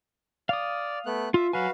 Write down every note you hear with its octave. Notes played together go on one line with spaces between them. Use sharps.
D5 F5 D#6
A3 B3 F#6
F4 E5
F#3 F#4 B4 F5 G#5